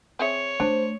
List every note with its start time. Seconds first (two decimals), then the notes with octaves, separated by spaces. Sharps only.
0.19 C4 G#4 C#5 E5
0.60 A3 D4 C5